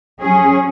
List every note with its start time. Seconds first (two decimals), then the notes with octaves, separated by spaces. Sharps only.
0.21 F#3 C#4 G#4